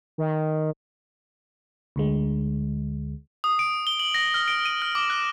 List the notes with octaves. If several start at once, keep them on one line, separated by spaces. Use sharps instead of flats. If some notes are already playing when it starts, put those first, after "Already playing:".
D#3
D2 D3 G#3
D#6
D7
G7
F#7
A#6
F6
D7
D#7
F6
D6
F#6